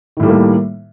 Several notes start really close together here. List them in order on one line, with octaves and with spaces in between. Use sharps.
D#3 A2 G3 A3 A#3